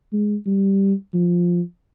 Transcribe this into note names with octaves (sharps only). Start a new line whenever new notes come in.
G#3
G3
F3